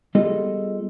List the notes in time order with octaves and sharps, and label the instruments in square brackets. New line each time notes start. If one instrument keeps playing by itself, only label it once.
[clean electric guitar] G3 B3 F4 G#4 A4 D#5